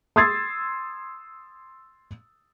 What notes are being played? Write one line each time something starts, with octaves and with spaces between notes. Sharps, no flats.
C6 D#6 E6 G#6 A6 C7